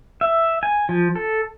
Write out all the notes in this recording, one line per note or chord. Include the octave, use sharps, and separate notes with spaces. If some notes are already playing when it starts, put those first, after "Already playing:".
E5
G#5
F3
A4